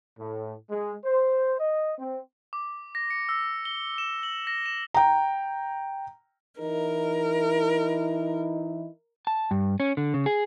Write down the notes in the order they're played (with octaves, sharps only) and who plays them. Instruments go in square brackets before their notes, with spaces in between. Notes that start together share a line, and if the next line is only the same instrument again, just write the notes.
[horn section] A2
G#3
C5
D#5
C4
[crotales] D6
A#6
C#7
E6
G7
E7
F#7
A#6
E7
[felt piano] G5 A#5
[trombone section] E3 D#4 E4 [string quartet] A#4
[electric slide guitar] A5
G2
C#4
D3
C#3
G#4